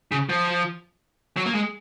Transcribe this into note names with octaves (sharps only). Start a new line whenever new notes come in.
C#3
F3
F#3
A#3
G#3